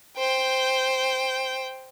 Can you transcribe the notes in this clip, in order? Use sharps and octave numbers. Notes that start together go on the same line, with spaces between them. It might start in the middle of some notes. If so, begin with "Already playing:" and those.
C5 G5